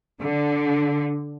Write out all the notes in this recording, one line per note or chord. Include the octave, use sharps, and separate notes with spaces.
D3